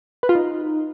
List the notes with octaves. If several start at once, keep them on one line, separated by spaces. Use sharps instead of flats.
B4
F4
D#4